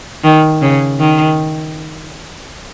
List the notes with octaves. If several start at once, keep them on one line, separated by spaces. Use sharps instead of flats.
D#3
C#3
D#3